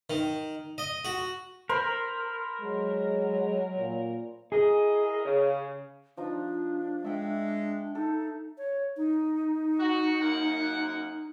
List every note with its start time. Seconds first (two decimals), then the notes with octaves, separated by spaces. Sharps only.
0.10 D#3
0.78 D#5
1.05 F#4
1.69 A#4 C5 B5 C6
2.61 F#3 G#3
3.78 A#2
4.52 E4 G#4 A#4 D#5
5.25 C#3
6.17 F3 D4 D#4
7.04 G#3 E5 G5
7.95 D#4 A4
8.58 C#5
8.97 D#4
9.79 F#4
10.21 F#2 A#3 F#5